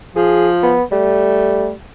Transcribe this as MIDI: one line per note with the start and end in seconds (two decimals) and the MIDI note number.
0.16 0.75 53
0.16 0.49 68
0.63 0.83 59
0.92 1.72 55
0.92 1.71 57